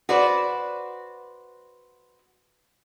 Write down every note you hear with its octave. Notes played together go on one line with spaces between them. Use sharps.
F#4 B4 C5 D5